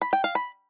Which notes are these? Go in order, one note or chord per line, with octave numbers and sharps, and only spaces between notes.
B5
G5
F5
B5